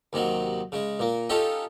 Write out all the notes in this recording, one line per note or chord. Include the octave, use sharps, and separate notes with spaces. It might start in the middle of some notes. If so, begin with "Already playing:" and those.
D#2 C3 D#3 F#3
C#3 G#3
A#2 A#3
C#4 D#4 F4 G4 A4